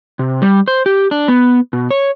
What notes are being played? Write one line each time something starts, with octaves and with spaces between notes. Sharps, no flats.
C3
G3
C5
G4
D4
B3
B2
C#5